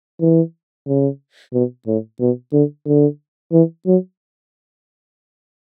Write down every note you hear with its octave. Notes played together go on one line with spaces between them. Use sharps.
E3
C#3
B2
A2
B2
D3
D3
E3
F#3